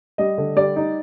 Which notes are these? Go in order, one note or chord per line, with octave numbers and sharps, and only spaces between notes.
G3 D#5
D3
G3 D5
D#4